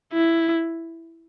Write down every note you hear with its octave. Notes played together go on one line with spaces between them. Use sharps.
E4